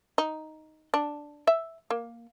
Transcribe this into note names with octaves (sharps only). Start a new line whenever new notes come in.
D#4
D4
E5
A#3